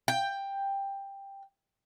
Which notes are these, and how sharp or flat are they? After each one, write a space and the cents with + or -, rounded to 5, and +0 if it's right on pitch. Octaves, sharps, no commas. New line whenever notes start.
G5 +10